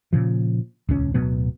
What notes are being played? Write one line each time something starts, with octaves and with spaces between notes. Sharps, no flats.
A#2 C#3 F3
D#1 C#2 C#4
D1 B2 F#3 B3